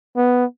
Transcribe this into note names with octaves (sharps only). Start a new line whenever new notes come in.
B3